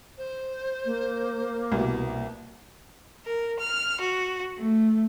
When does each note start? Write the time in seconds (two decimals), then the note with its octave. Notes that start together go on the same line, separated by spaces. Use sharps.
0.18 C5
0.85 A#3
1.72 C2 B2
3.25 A#4
3.59 F6
3.99 F#4
4.57 A3